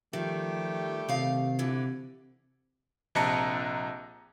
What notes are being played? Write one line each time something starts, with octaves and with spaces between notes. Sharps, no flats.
D#3 F3 G3 A3 G4
C3 D#3 F5
D3 E3
A#1 C3 D#5 A5 A#5 C#7